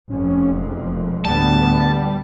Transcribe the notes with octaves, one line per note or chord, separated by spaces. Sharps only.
F1 F2 C#4
E1
D2 A2 G3 B3 A5